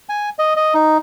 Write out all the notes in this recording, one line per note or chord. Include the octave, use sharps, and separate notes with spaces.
G#5
D#5
D#5
D#4